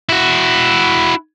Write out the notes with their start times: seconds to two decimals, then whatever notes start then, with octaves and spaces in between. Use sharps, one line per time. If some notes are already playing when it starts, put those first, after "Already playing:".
0.09 E4 F#4